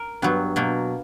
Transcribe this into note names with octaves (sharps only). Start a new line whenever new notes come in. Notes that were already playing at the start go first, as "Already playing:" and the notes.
Already playing: A#4
G2 F#3 B3
B2 F#3 A#3